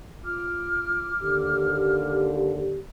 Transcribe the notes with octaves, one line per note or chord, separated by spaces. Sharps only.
F4 D6 F6
D#2 D3 G4